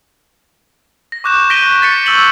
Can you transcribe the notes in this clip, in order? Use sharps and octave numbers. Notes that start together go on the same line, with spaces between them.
A#6
C#6 D6 F#6 G6 E7
G6 A#6 B6 D7 D#7 G7
A6 B6 C#7 E7
C#6 D6 E6 G6 F#7 G7